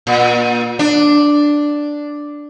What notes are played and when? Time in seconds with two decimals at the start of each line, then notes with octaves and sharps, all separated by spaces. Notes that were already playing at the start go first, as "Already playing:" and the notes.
0.07 A#2
0.79 D4